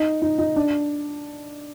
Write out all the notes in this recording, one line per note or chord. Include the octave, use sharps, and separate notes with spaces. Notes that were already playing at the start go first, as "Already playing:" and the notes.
Already playing: D#4
D#4
D#4
D4